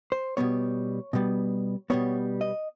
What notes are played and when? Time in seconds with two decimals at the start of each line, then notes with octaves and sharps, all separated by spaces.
0.12 C5
0.37 B2 G3 B3 C#5
1.13 B2 G3 B3
1.90 B2 G3 B3 C#5
2.41 D#5